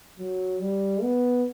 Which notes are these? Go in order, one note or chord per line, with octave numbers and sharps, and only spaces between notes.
F#3
G3
B3